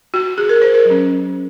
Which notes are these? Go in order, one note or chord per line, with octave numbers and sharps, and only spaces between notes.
F#4
G#4
A#4
C5
A#4
F#3 C#4